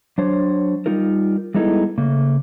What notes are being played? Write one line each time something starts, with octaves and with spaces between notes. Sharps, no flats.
F#3 D4 C5 C#5
G3 D#4 F4 A#4
G3 G#3 B3 D#4 E4 A4
C#3 A3 A#3